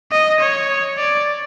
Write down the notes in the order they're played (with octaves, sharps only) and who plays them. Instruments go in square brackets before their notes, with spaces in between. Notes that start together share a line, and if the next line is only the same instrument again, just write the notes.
[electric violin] D#5
C#5
D5